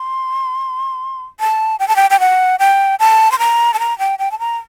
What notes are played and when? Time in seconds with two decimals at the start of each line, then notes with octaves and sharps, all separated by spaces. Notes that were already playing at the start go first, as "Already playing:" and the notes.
Already playing: C6
1.40 A5
1.80 G5
1.88 A5
1.96 G5
2.10 G5
2.20 F#5
2.59 G5
3.00 A5
3.32 C6
3.39 A#5
3.74 A5
3.79 A#5
3.99 G5
4.19 G5
4.31 A5
4.39 A#5